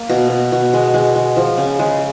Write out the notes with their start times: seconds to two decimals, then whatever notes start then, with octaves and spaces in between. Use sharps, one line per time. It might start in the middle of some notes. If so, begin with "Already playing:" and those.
Already playing: A#3
0.10 B2
0.30 B2
0.52 B2
0.73 G#3
0.94 G#3
1.16 G#3
1.36 F3
1.57 C#3
1.79 G#3